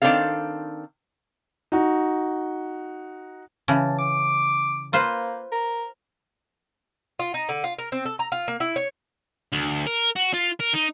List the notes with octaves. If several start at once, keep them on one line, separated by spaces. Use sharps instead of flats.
D#3 A3 C4 D4 A4 F5
D#4 F#4
C#3 E3 A5
D6
A#3 F4 B4 C5
A#4
F4
D#4
D3
F4
A#4
C4
A4
A#5
F4
A#3
E4
C#5
D2
A#4
F#4
F4
A#4
D#4